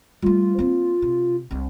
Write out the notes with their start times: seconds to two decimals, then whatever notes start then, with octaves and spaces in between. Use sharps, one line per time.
0.22 G3 A3 F4
0.59 A#3 C4
1.02 C3
1.51 C2 D4